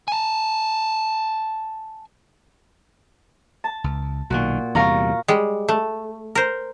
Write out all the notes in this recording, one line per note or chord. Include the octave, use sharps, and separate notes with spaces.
G#5 A5
A5
C#2
B1 A#2 D#3 F#4
E2 C3 G3 F5 A#5 C#6
G3 G#3
A3
A#4 C5